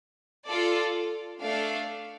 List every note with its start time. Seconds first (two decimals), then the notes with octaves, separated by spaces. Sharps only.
0.46 F4 A4 D5
1.40 A3 D4 A4 D5 F5